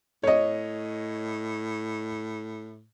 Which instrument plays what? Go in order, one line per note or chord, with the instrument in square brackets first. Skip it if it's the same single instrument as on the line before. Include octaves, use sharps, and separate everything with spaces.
[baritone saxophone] A2 [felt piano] C#5 D#5